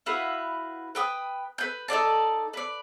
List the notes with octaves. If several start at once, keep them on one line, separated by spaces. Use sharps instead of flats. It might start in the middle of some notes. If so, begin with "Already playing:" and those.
E4 F#4 B4 F5
B4 G5 D#6
B4 G6
D#4 A4 D5 A5
B4 D5